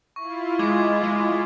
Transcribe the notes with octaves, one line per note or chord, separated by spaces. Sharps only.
E4 F4 C#6
G#3 D6 G#6
G#3